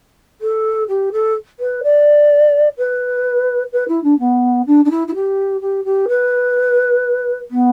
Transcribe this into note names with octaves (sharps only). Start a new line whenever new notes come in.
A4
G4
A4
B4
D5
B4
B4
E4
D4
B3
D4
D4
E4
E4
G4
G4
G4
B4
B3